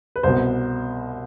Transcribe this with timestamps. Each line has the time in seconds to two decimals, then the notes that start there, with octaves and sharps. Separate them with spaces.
0.16 B4
0.23 C2 B2 C5